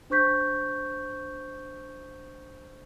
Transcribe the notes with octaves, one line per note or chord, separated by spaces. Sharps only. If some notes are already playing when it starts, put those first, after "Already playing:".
D4 C5 C#6 G6 B6